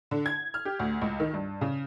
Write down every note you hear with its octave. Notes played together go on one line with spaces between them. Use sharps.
D3
G#6
F6
G4
D2
C#2
D#3
G2
C#3